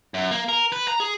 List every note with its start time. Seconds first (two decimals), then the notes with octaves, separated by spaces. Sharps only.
0.14 F#2
0.31 A#3
0.49 A#4
0.72 B4
0.88 A#5
1.00 G#4